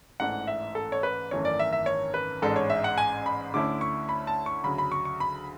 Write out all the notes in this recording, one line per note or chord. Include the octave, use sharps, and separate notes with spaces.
A1 G#2 E3 A3 D4 F#5
E5
A4
C#5
B4
G#1 F#2 E3 A3 C#5
D5
E5
E5
C#5
B4
A1 G#2 G#3 D4 A4
C#5
E5
F#5
G#5
B5
D2 D3 A3 C#4 E4 D6
C#6
B5
A5
C#6
D2 C#3 F#3 B5
B5
C#6
C#6
B5